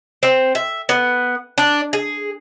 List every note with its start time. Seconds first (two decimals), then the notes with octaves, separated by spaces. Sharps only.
0.23 C4
0.55 E5
0.89 B3
1.58 D4
1.93 G#4